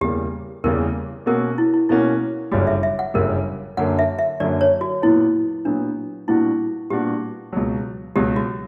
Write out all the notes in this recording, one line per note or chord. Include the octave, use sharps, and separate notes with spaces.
E2 C#3 G3 A#3 G4
E2 C#3 G3 A#3 A#4
B2 A#3 C#4 F#4 A#4
E4
E4
B2 A#3 C#4 E4 F#4
G1 F#2 C#3 G3 F#4
E5
E5
F#5
G1 F#2 C#3 G3 A#4
F#2 D3 F#3 A#3 F#5
E5
E5
F#2 D3 F#3 A#3 D5
C#5
F#4
A#2 F#3 B3 E4
A#2 F#3 B3 D4
A#2 G3 B3 D4 E4 F#4
A#2 G3 B3 D4 F#4 G4
C#2 B2 F#3
C#2 B2 F#3 G4
F#4